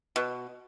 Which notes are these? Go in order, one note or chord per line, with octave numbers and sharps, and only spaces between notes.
B2